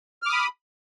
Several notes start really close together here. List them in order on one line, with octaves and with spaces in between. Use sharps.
F6 D6 D#6 B5